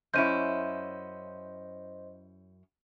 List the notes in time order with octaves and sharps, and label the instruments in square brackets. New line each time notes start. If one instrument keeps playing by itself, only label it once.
[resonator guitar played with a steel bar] F#2 C#4 E4 [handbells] C5 D#5 C6 [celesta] G6 D#7